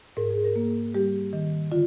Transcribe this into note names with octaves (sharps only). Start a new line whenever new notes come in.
G#2 A#4
G#4
A#4
A#3
G3 G4
D#3
D3 F4